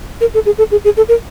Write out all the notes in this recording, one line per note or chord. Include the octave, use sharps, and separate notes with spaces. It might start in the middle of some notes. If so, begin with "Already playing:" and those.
A#4
A4
G#4
A4
G#4
G#4
A4
A#4